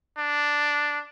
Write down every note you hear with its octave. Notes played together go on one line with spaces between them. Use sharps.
D4